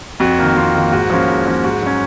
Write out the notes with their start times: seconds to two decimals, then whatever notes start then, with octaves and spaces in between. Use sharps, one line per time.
0.20 F2 F#4
0.39 D#3 A#3
0.56 F2 F4
0.74 D#3 A#3
0.92 G#2 F#4
1.10 F3 A#3 C#4
1.28 G#2
1.46 F3 A#3 C#4
1.64 G#2 F#4
1.82 F#3 C#4